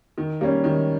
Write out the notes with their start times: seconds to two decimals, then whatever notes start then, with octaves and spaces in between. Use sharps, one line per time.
0.18 D#3
0.41 G3 A#3 C#4
0.64 D#3